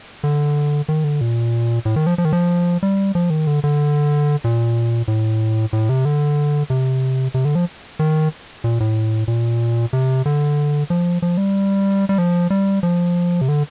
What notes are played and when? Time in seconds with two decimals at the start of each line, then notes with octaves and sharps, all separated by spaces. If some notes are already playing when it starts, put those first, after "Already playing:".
0.24 D3
0.89 D#3
1.04 D3
1.21 A#2
1.85 A2
1.96 D#3
2.07 F3
2.18 F3
2.25 D#3
2.33 F3
2.83 G3
3.15 F3
3.30 D#3
3.47 D3
3.64 D3
4.44 A#2
5.08 A2
5.73 A2
5.89 C3
6.05 D3
6.70 C3
7.34 C3
7.45 D3
7.55 F3
7.99 D#3
8.64 A#2
8.80 A2
9.28 A#2
9.93 C3
10.26 D3
10.90 F3
11.22 F3
11.37 G3
12.09 G3
12.18 F3
12.50 G3
12.83 F3
13.41 C3
13.48 D3